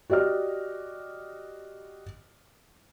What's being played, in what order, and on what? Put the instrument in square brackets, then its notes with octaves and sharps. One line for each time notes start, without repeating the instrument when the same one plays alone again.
[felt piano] F#4 G4 D5 D#5 F6